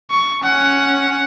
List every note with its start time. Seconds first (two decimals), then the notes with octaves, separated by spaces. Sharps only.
0.11 C#6
0.43 C#4 F#5